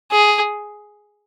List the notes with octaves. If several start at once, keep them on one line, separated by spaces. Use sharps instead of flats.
G#4